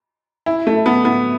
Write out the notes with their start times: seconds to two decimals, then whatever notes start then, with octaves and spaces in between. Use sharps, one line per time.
0.46 E4
0.67 A3
0.86 B3
1.05 B3